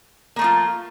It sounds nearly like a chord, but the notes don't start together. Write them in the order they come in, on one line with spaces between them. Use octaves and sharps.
A#3 A3 F3 F4